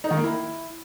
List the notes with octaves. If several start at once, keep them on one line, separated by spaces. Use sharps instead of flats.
D#4
D#3
A#3
E4